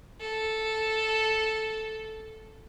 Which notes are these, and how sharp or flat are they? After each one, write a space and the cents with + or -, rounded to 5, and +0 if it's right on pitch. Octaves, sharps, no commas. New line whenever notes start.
A4 -5